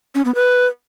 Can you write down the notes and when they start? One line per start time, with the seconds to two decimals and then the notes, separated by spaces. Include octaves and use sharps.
0.15 C#4
0.25 B3
0.35 B4